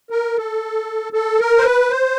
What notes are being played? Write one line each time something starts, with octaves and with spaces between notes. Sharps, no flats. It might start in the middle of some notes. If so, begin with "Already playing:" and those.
A#4
A4
A4
A#4
C5
B4
C5